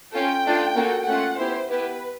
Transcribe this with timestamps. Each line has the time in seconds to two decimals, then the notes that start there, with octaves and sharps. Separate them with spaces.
0.13 C#4 F4 A4 G5
0.45 A3 D4 F4
0.76 A#3 C#4 F#4 A4
1.07 A3 C#4 F4 F#5
1.39 B3 E4 G4 C5
1.70 B3 E4 G4 B4